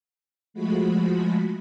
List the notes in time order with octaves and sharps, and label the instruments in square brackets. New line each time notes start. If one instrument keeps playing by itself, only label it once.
[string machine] F3 G#3 A3 F#4 B5